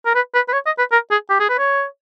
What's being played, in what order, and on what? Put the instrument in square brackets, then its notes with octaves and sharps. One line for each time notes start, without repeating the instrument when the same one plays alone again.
[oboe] A#4
B4
B4
B4
C#5
D#5
B4
A#4
G#4
G4
G#4
B4
C#5